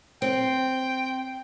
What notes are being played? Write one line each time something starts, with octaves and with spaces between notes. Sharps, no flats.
C4 G5